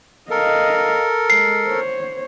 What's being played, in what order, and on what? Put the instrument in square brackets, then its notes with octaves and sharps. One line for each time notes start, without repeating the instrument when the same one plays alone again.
[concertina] A4 A#4 [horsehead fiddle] D#5 F5
[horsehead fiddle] G#3 [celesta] C7
[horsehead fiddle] C5 C#5